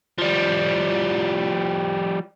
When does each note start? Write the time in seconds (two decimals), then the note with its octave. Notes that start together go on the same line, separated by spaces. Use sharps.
0.18 F3 G3